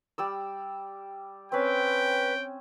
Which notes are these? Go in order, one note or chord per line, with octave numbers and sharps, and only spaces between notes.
G3 D5 E6
C4 C#4 B4 G5